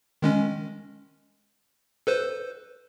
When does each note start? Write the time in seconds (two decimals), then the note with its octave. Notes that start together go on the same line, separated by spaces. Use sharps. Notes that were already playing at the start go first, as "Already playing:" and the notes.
0.22 D#3 G#3 C#4
2.07 A4 B4 C5